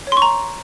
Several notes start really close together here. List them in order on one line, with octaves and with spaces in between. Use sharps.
C#5 C6 C#6 A#5